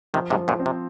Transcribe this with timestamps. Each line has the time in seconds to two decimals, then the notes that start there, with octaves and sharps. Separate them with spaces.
0.14 C3 D#3 F3
0.30 G#2 C3
0.37 F3
0.48 F#2 A#2
0.60 C4
0.66 C3